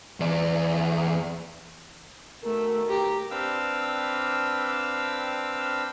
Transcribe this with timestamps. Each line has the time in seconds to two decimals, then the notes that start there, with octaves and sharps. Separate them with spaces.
0.20 E2 D5
2.44 B2 D#3 A3 A#4
2.89 G4 A#5
3.30 C4 D4 B4 F5 G5 E6